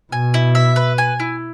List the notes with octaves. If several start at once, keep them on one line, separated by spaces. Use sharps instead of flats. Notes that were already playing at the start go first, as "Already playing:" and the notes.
B2 G#5
E4
E5
B4
G#5
E4